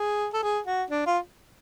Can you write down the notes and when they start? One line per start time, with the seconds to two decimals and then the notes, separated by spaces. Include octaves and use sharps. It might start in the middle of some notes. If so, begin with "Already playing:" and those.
Already playing: G#4
0.34 A4
0.43 G#4
0.66 F#4
0.90 D4
1.06 F4